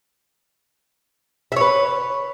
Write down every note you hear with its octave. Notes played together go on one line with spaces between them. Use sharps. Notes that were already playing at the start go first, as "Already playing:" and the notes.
B4 C#5 E5